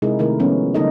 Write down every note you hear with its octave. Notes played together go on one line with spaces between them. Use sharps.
C3 G#3 D#4 E4 G#4 A#4
C3 D#3 A3 E4 A#4
F3 G#3 B3 C#4
D3 G3 A#3 D#4 A4 D#5